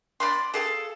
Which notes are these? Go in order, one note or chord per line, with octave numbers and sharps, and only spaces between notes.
D5 B5 C6
G#4 A4 F5